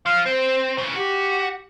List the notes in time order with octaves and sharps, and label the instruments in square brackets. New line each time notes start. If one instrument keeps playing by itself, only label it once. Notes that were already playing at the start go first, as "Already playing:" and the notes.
[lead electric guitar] F3 [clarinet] F5
[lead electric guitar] C4 [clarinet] C5
[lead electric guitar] C#3 E3
[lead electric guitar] F#4 [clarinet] G4